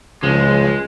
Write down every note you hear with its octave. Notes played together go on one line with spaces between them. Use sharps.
C#2 C#3 F3 G#3